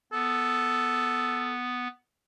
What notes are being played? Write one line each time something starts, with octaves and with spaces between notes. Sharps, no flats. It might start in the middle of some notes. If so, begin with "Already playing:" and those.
B3 A4